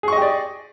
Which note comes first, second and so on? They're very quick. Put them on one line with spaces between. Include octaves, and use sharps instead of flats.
G#4 C#6 D#5 G4 D5